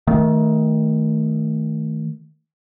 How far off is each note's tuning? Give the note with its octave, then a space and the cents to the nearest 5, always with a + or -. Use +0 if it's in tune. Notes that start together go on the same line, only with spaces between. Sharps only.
D#3 +15 A3 +0